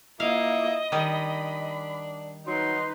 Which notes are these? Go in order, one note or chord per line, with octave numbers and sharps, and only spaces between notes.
A#3 E4 F4 D#5 F5
D#3 G3 D4 B5
F#3 D#4 B4 C6